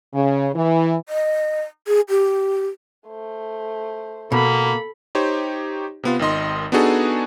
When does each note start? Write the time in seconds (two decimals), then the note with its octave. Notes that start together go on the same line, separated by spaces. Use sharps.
0.14 C#3
0.55 E3
1.08 D#5
1.87 G#4
2.09 G4
3.08 A3 C5
4.32 B2 A#3 A4 B5
5.15 D#4 G4 C5 C#5
6.03 C3 B3 F4
6.19 G#1 D#3 D#5 C6
6.72 B3 D4 D#4 F#4 G#4 A4